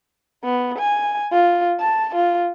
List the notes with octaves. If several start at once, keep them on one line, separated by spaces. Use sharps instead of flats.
B3
G#5
F4
A5
F4